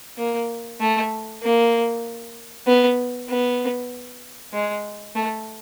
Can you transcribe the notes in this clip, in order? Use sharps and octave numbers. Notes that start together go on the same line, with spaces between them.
A#3
A3
A#3
B3
B3
G#3
A3